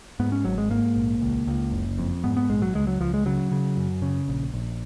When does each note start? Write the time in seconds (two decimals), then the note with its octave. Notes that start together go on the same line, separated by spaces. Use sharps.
0.20 G#2 B3
0.32 C#4
0.45 G#1 F#3
0.58 G#3
0.70 G#2 A#3
0.96 A#1
1.22 C#2
1.47 C#2
1.72 F#1
1.98 F2
2.24 G#2 B3
2.37 B3
2.49 A#1 G#3
2.62 F#3
2.75 C#2 G#3
2.87 F#3
3.01 C#2 F3
3.14 G#3
3.26 C#3 F#3
3.52 C#3
3.77 F#2
4.02 C#3
4.28 A#1
4.54 A#1